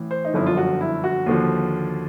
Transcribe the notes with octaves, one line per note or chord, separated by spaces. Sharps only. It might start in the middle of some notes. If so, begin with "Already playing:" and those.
Already playing: A1 A2 E3
C5
D#4
G1 F#2 D3 F3 E4
F4
F#4
E4
F#4
D#2 D3 F3